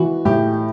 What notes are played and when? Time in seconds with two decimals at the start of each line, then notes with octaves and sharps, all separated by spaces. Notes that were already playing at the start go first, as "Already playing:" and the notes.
Already playing: E3 F#4
0.25 A2 G4